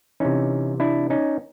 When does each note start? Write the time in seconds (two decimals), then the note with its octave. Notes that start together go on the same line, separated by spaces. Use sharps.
0.20 C3 E3 C#4 D#4
0.80 D4 E4
1.10 C#4 D#4